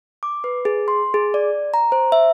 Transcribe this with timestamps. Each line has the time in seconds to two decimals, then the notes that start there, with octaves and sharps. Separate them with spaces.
0.23 D6
0.44 B4
0.65 G#4
0.88 C6
1.14 G#4
1.34 D5
1.74 A#5
1.92 C5
2.12 E5